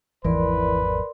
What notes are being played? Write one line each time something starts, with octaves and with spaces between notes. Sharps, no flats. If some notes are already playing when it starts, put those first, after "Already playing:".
G#1 E2 E3 F3 A#4 B4 D5 C6